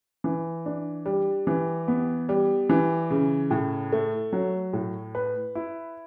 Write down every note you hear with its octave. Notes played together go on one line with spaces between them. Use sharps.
E3
D4
G3
E3
B3
G3
E3
C#3
A2
A3
F#3
A2
B4
E4